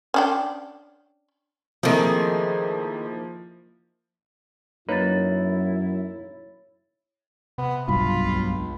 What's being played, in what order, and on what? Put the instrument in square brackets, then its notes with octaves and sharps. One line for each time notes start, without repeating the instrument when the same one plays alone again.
[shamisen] C#4 D4 G5
[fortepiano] C3 A3 [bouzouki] D#3 G#4 [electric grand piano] F3 A#3 E4
[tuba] F#2 [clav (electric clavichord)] A#3 D#4 B4 [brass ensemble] E4 [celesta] C#5 A6
[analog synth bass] C3 [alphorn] B3
[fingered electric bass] B1 G2 B2 [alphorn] F4 [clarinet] B5
[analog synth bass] C#2